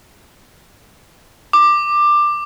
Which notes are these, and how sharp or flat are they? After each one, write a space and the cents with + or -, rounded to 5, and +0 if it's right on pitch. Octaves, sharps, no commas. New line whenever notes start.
D6 +15